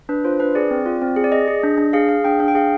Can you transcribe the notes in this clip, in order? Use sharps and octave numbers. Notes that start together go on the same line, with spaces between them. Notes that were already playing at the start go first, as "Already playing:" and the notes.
D4 B4
F4 C5
D4 B4
G#4 D5
C4
F4
C4
G#4
D5
G#4 D#5
G#4
D4
D4
G#4 F5
G#4 F5
D4 G5
D4 F5
G5
G#4 F5